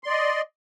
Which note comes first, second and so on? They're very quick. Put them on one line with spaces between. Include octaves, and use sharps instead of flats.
C6 D5 D#5